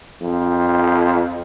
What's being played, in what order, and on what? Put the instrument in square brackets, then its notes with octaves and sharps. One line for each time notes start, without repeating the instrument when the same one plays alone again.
[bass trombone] F2